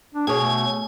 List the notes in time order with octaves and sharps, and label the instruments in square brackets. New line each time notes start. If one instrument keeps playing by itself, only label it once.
[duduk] D4
[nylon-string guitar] B2 C#5 [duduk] G#4 [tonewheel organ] G#5
[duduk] A3